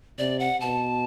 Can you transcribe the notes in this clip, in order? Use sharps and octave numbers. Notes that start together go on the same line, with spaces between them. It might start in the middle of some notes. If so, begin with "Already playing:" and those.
C3 D5
F#5
B2 A5